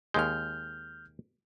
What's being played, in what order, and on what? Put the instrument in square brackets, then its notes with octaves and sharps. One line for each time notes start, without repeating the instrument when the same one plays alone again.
[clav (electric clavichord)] D#2 G#3 [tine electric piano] F6 G6